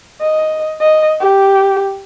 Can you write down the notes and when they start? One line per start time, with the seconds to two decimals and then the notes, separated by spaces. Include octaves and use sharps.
0.20 D#5
0.81 D#5
1.20 G4